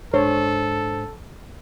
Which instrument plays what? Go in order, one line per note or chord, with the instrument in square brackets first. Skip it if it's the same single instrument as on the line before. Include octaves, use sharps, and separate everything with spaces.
[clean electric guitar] G#2 D4 C5 [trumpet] A4 [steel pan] C#5